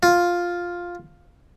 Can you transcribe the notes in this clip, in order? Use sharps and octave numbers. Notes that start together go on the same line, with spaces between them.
F4